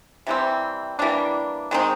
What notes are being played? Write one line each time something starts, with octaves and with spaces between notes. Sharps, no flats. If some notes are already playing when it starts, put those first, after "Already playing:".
C3 E3 G3 C4
E3 G3 A#3 D4
D#3 G#3 C4 D#4